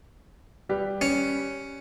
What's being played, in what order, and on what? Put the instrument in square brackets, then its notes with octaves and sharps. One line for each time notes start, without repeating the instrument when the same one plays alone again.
[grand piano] G3 G4 B4
[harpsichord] C#4